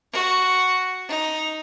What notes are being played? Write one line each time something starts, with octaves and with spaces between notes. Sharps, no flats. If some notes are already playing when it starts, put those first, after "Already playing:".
F#4
D#4